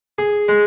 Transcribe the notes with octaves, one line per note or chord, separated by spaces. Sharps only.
G#4
G#3